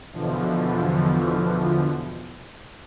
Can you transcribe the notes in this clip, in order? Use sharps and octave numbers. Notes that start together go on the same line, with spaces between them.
E2 B2 D3 E3 F3